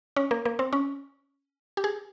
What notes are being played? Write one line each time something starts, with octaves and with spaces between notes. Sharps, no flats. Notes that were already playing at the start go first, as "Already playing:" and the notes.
C#4
A#3
A#3
C4
C#4
G4
G#4